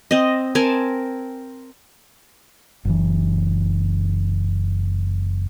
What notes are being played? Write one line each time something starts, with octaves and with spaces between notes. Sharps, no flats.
C4 D#5
C4 A#4 G#5 A5
F#1 E3